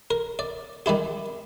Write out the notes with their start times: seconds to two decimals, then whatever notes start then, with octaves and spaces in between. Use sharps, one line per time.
0.11 A#4
0.39 D5
0.86 D#3 G3 E4 G4